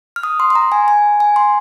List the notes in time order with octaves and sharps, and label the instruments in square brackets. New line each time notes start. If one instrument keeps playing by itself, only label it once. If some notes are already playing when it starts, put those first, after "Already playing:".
[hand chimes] F6
D#6
C6
C6
A#5
G#5
G#5
G#5
C6